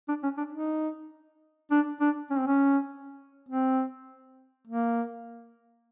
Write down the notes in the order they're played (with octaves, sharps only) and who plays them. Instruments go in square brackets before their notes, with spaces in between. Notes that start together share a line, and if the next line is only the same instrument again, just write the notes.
[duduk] D4
C#4
D4
D#4
D4
D4
C#4
C4
C#4
C4
A#3